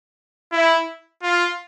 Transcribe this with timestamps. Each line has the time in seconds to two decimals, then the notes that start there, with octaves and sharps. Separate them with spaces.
0.52 E4
1.23 F4